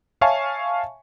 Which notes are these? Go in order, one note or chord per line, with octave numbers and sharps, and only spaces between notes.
C#5 E5 F5 G#5 A5 C#6